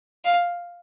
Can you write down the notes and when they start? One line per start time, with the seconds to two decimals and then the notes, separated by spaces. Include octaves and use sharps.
0.25 F5